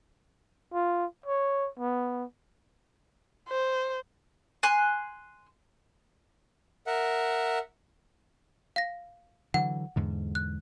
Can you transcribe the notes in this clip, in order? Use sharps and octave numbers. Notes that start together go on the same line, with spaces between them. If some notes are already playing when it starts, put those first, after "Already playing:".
F4
C#5
B3
C5
G#5 C6 F#6
A#4 E5 F#5
F5 A#6
D3 E3 F#3 F#5
E2 G#2 D3
F#6